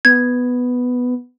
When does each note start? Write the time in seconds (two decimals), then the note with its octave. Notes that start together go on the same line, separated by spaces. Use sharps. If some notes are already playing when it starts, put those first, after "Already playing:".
0.05 B3 G#6